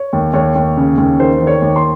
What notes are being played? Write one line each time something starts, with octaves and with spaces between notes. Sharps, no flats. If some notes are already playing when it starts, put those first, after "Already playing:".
Already playing: C#5
D#2
D#2 C#5
D#2
C#3
D#2
D#3 C5
D#3
C#5
D#2
C6